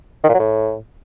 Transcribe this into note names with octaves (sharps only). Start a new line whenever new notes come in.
D#3
A#2
F#3
A2